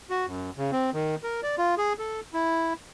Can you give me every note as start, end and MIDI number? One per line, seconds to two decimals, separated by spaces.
0.10 0.26 66
0.27 0.50 42
0.57 0.71 49
0.72 0.90 60
0.94 1.15 51
1.23 1.41 70
1.43 1.55 74
1.58 1.75 65
1.78 1.93 68
1.99 2.20 69
2.33 2.73 64